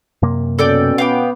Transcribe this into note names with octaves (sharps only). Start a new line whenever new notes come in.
F#2 C3 A#3
B2 C#4 A4 D5 G5
B3 F5 G5 D6